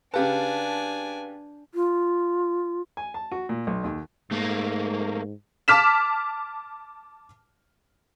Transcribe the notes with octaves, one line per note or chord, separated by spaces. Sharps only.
C#3 D4 G4 B4 F5 G#5 A5
F4
G#5
A5
F#4
A#2
B1
D#2
G#2 A3 A#3
A5 D6 F6 B6 E7